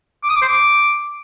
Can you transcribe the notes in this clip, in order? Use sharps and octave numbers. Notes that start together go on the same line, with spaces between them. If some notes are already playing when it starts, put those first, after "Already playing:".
D6
D#6
D6
C5
D6